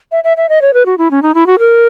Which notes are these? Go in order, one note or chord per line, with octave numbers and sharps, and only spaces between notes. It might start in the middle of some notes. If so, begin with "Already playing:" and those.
E5
E5
E5
D#5
C#5
B4
F#4
E4
C#4
D#4
E4
F#4
A#4